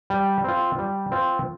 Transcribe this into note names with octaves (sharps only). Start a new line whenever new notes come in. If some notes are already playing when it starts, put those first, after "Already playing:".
G3
C4 F4
G3
C4 F4